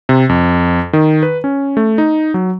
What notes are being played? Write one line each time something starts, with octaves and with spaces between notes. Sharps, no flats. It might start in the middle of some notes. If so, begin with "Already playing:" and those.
C3
F2
D#3
B4
C#4
A3
D#4
F#3